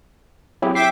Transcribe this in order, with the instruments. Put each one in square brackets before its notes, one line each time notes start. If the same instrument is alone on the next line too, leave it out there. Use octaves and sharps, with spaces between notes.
[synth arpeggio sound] F#3 C4 [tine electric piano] E4 G4 G#4
[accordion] E5 G5 D6 [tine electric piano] C7